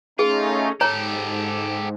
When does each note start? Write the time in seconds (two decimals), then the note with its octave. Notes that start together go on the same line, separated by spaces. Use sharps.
0.19 A3 C#4 D#4 F4 G#4
0.81 G#2 G4 A4 C#5 A#5